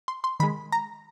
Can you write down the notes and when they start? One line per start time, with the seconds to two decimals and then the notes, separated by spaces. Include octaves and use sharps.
0.08 C6
0.24 C6
0.40 D#3 G#3 B5
0.72 A#5